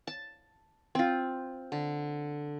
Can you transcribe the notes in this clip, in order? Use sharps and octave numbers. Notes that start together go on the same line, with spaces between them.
A5
C4 F4
D3